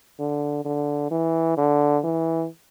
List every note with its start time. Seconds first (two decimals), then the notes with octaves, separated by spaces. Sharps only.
0.19 D3
0.65 D3
1.11 E3
1.57 D3
2.04 E3